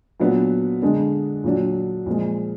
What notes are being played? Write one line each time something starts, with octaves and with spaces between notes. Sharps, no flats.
A#2 F#3 B3 D4
D3 G#3 D4
A#2 F#3 D4
A#2 F3 G#3